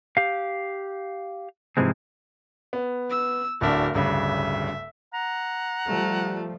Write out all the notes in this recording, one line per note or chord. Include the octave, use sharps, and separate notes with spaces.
G4 F5
G#2 C3 E3 F3 G#3 C4
B3
E6
D1 D4 F#4 A#4 E5
D1 G2 C#3 E5
F#5 A#5
F3 G3 A3